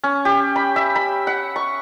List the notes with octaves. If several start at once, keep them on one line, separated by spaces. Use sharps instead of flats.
C#4
G4
B5
E5
B5
F#5
C#6